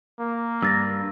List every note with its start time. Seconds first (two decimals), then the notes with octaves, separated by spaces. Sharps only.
0.20 A#3
0.62 G2 E6 A6 A#6